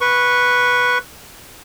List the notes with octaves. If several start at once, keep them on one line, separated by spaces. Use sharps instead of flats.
B4 C#6